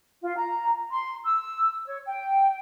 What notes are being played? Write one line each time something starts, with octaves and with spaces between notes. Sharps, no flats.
F4
A#5
C6
E6
C#5
G5